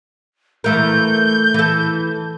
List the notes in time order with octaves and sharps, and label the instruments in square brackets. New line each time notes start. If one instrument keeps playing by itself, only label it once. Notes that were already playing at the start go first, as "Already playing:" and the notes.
[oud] E3 A3 A#4 [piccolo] G6
[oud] E3 A4